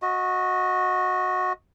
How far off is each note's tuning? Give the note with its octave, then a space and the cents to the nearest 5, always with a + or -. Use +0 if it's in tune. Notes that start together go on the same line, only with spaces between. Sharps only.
F#4 -15 D#5 +20